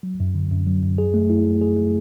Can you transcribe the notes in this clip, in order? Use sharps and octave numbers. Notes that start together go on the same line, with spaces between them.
F#3
F#2
D3
F#2
F#3
F#2
G#4
A3
E4
A3
G#4
A3